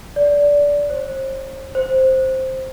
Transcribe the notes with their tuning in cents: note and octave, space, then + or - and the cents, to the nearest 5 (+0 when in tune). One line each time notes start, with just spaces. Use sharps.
D5 -20
C5 +35
C5 +5